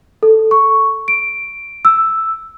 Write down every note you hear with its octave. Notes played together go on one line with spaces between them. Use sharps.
A4
C#6
D7
E6